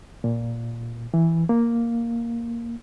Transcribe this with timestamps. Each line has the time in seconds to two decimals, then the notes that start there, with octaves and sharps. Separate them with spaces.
0.24 A#2
1.14 E3
1.49 A#3